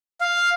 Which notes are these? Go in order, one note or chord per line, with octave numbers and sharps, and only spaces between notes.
F5